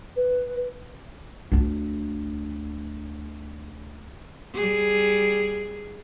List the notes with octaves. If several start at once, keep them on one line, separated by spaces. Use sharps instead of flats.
B4
D2 D4
G3 G#4